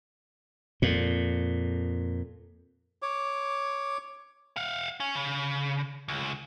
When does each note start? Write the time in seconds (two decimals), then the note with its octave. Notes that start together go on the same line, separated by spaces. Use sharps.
0.82 F2 A#2
3.02 C#5 D6
4.56 F5 F#5
5.00 C#4
5.15 C#3
6.08 C#2